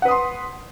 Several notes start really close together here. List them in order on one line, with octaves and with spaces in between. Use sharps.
F#5 B4 D#6 C6